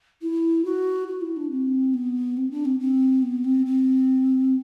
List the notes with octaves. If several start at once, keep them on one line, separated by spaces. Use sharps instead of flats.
E4
F#4
F#4
E4
D4
C4
B3
C4
D4
C4
C4
B3
C4
C4